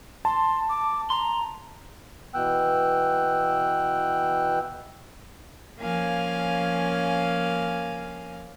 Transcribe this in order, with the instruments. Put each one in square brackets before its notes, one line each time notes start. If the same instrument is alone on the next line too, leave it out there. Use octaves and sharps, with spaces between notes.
[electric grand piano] A5 [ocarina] C6
[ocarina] D6
[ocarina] A#5 [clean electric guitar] C6
[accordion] B2 E3 B3 G5 E6 F#6
[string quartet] F3 A#3 C#4 F5 G#5